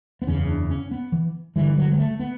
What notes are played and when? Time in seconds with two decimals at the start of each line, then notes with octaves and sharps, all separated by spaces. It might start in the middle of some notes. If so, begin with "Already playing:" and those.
0.22 B3
0.27 F#1 E2 C#3 C#4
0.48 D4
0.70 C#4
0.91 B3
1.12 E3
1.56 G1 G2 D3 E3
1.77 F#3
1.91 G3
1.98 A3
2.19 B3